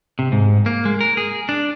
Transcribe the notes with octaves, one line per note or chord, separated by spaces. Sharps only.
C3
G#2
A#3
G#3
A#4
G#4
D4